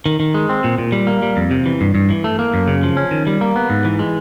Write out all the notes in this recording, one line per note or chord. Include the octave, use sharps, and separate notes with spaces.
D#3
D#3
G#3
C4
A#2
A#2
G3
A#3
G3
F2
C3
E3
G2
G2
E3
A3
A#3
F#2
C#3
F3
C#4
D#3
G3
A#3
B3
G#2
E3
G#3